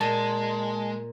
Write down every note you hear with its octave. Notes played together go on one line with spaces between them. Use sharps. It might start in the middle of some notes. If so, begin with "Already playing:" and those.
A#2 G#3 A5